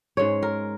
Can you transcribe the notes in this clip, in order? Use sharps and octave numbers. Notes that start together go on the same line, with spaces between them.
G#2 G#3 C#4 C#5
A#4